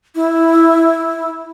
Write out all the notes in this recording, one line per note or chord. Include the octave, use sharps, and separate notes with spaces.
E4